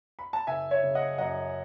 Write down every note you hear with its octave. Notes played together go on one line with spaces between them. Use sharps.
B5
A5
F#1 E5 G#5
C#5 E5
C#3
D#5 F#5
F#2 D#5 F#5